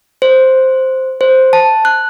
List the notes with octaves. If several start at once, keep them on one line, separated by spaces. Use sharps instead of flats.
C5
C5
A5
F#6